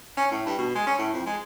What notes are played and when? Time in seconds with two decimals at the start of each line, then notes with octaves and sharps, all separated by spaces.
0.17 C#4
0.32 A2
0.46 G2
0.58 B2
0.75 G#3
0.87 C#4
0.99 A2
1.14 F2
1.26 G#3